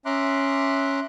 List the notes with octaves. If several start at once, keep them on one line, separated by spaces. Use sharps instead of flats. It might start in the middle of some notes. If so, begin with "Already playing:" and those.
C#4 E5 A#5 C6 D6 F#6